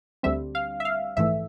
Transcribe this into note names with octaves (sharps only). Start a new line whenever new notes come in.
D2 D3 G3 C4 E5
F5
E5
F5
A#1 G#2 E3 A3 E5